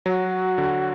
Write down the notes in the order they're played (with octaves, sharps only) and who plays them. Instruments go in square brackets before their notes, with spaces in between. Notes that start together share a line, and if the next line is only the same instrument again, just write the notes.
[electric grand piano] F#3 [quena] F#4
[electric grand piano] D3